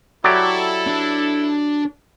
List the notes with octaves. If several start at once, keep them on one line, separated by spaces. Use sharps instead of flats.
F#3 E4 G4 A4 D5
D4